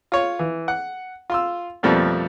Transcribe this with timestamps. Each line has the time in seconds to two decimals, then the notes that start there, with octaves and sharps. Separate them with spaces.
0.12 F4 C#5
0.39 E3
0.68 F#5
1.30 F4 C6 E6
1.83 F2 B2 F3 G3 A3 A#3